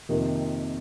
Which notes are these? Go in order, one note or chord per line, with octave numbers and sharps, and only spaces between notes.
F2 C3 D#3 A#3